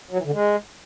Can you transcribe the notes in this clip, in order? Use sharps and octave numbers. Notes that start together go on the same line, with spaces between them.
F#3
E3
D3
G#3